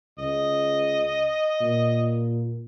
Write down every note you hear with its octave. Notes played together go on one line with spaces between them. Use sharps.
C#2 D#5
A#2